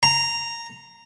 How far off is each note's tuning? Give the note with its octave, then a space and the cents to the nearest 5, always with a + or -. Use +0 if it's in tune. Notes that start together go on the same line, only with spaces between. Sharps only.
A#5 -10